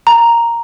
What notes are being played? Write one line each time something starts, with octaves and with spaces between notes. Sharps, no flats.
A#5